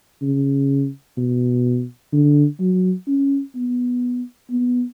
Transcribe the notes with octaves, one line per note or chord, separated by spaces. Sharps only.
C#3
B2
D3
F#3
C#4
B3
B3